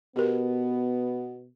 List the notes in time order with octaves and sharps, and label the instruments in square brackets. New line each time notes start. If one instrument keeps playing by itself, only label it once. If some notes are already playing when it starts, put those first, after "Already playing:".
[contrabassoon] B2 [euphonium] B3 [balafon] G4 A#4